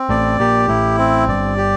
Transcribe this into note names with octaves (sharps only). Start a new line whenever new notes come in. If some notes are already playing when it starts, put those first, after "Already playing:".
Already playing: C4
A1 A2 D5
A#1 A#2 G4
A1 A2 E4
C4
G1 G2 D5
G4